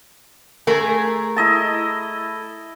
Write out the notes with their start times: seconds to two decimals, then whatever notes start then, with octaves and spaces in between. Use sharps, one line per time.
0.67 A3 G#4 A#4
1.36 E4 D#5 A5